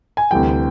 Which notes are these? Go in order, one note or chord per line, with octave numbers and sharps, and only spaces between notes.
G#5
D2 C3 E3 G3 G5